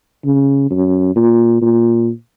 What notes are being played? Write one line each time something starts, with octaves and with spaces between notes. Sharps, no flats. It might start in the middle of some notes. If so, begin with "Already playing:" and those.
C#3
F#2
A#2
A#2